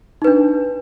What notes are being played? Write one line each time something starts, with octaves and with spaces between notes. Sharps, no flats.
D4 D#4 B4